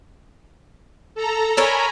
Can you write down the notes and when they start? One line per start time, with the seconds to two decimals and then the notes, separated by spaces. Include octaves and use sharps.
1.15 A4 A#5
1.57 A4 A#4 C#5 G#5 A#5 B5